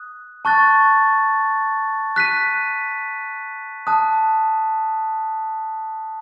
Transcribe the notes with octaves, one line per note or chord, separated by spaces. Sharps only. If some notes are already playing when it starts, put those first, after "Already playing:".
Already playing: D#6 F#6
A5 C#6 F#6 A6
F#6 B6 D#7
A5 D#6 F#6